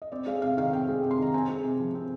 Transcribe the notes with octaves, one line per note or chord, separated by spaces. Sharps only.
D#5
C4 D5
G#3 F5
C3 F5
D#3 F5
C4 G5
G#3
C3
C6
D#3 A#5
C4 G#5
G#3
C3
F3
C4